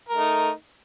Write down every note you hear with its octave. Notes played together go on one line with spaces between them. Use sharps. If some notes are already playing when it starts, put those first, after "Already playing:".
A3 D#4 A#4